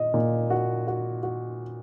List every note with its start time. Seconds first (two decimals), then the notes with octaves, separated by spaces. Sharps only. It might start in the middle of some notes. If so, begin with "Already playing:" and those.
Already playing: A#2 D#5
0.14 A#2
0.50 F#4
0.87 F#4
1.23 F#4